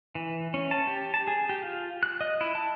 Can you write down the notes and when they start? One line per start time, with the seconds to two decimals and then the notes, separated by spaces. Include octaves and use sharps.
0.15 E3
0.54 C#4
0.71 A5
0.87 G4
1.14 A5
1.27 G#4
1.49 G4
1.62 F4
2.03 F#6
2.21 D#5
2.41 E4
2.55 A5